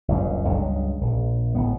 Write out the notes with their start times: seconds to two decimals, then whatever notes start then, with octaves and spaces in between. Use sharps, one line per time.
0.08 F#1 C#2 G2
0.49 C#2 G2 F#3 G#3
1.01 A#1
1.55 G#1 A2 B3